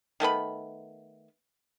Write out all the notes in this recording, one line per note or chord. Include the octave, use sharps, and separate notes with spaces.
D#3 A3 B3 B5